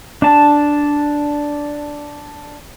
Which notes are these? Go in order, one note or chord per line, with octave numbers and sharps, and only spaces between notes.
D4 A5